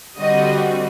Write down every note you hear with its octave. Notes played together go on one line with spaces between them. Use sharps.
D3 G3 C4 F#4 D#5